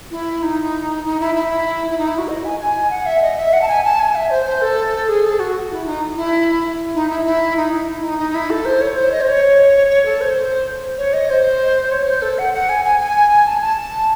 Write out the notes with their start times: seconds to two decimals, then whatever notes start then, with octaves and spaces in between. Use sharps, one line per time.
0.11 E4
0.43 D#4
1.05 D#4
1.20 E4
1.35 E4
1.91 E4
1.98 D#4
2.08 E4
2.18 F#4
2.28 D#5
2.45 G#5
2.60 G#5
2.91 F#5
3.06 E5
3.22 D#5
3.38 E5
3.53 F#5
3.62 A5
3.68 G#5
3.84 A5
3.99 G#5
4.15 E5
4.31 C5
4.46 C5
4.62 A4
5.09 G#4
5.24 A4
5.39 F#4
5.71 E4
5.86 D#4
6.16 E4
6.94 D#4
7.10 E4
7.25 E4
7.57 D#4
7.72 D#4
7.87 E4
8.03 D#4
8.19 D#4
8.35 E4
8.50 A4
8.65 C5
8.81 C#5
8.97 C5
9.12 D#5
9.21 C5
9.27 C#5
10.06 A4
10.21 C5
10.98 C#5
11.14 D#5
11.30 C5
11.92 C#5
12.07 C5
12.22 A4
12.38 F#5
12.54 F#5
12.69 G#5
12.85 G#5
13.00 G#5
13.47 A5
13.62 A5